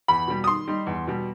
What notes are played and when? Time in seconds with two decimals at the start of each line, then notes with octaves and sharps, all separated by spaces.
0.08 E2 B5
0.27 B2 G3
0.44 D#6
0.47 D#3 C6
0.68 G3 D#4
0.87 E2
1.07 B2 G3